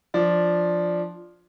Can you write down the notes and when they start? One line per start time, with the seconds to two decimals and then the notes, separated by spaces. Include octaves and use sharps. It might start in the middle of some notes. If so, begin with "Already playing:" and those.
0.14 F3 D4